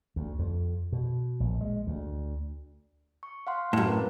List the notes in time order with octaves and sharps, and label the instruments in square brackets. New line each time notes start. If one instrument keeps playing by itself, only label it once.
[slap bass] D2
F2
B2
A#1
G#3
D2
[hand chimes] C#6
F5 F#5 C6
[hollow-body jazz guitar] F#2 A2
[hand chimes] C4 A#4 B4